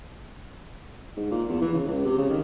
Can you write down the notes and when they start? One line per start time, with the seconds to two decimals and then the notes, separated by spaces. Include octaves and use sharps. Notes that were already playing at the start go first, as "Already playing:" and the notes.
1.17 G#2
1.31 A#2
1.49 E2
1.61 E3
1.74 C#3
1.87 C#2
2.05 C3
2.18 C#3
2.30 D#3